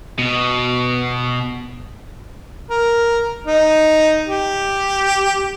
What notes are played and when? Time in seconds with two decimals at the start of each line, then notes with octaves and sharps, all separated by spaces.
0.19 B2
2.70 A#4
3.47 D#4
4.28 G4